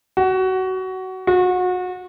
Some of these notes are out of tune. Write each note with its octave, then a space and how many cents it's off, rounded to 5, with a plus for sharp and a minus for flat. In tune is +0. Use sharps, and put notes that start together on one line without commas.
F#4 +20
F#4 -30